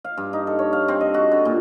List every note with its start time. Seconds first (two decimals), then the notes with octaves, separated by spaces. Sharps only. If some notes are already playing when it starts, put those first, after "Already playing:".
0.04 F5
0.17 G2
0.33 D#4
0.47 A4
0.59 C#5
0.73 F5
0.88 C4
1.01 D#5
1.14 F#4
1.32 D3
1.45 A#2